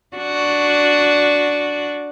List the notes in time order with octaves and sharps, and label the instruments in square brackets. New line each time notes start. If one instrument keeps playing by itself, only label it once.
[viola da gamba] D4 F#4